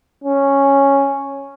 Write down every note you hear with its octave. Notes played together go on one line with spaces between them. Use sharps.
C#4